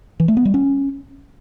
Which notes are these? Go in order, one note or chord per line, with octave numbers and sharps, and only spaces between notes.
E3
A3
B3
G3
C#4